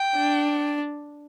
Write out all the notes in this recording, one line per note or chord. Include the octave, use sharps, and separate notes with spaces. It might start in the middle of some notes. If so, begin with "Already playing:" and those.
Already playing: G5
D4